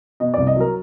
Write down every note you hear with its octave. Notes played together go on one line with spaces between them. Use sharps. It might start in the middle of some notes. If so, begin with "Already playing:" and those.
B2 D#5
C2 D5
D#5
F#3 A#4